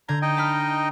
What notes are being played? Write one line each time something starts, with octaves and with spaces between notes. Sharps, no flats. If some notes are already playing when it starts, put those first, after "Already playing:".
D3 A#5 G6 G#6
D#4 D#5 G5
A5 B5 F6